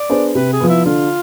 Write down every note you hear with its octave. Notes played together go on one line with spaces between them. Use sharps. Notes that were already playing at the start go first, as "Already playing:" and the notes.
Already playing: D5
B3 D4 G#4 C5
C3 B4
G#4
F3 B3
E4
D3 F4